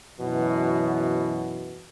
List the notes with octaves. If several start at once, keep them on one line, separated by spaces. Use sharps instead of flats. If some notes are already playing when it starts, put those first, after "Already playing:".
F#2 B2 E3